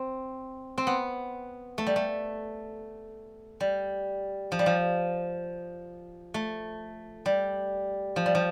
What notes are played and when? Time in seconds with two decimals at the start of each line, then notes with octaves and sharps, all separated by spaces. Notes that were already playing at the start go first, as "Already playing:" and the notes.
Already playing: C4
0.78 C4
0.87 B3
1.78 A3
1.87 G3
1.96 A3
3.60 G3
4.52 F3
4.59 G3
4.66 F3
6.34 A3
7.26 G3
8.16 F3
8.26 G3
8.35 F3